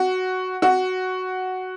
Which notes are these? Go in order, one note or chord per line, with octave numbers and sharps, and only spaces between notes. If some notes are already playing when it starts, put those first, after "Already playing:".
Already playing: F#4
F#4